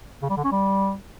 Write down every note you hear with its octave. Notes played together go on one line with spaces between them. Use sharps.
C#3
G3
D3
C#4
G3